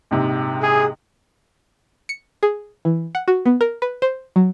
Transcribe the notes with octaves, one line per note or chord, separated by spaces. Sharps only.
A#1 G#2 C3
G#4
C#7
G#4
E3
F#5
F#4
B3
A#4
B4
C5
F#3